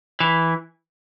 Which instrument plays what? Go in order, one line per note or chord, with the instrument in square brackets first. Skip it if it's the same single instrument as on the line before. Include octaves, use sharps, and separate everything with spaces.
[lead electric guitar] E3